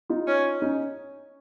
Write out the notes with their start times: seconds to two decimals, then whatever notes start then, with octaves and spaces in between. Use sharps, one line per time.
0.10 D#4 F4
0.27 C#4
0.62 C#4 D#4